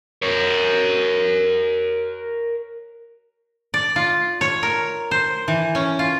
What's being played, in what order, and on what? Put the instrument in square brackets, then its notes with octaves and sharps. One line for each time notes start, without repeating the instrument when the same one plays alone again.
[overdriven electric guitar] A#4 C#5
[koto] D5
F4
C#5
A#4
C5
E3
C#4
F4